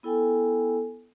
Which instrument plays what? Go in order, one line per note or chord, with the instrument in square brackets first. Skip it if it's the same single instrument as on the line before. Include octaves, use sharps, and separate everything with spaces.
[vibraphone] B3 E4 A4 G5 G#5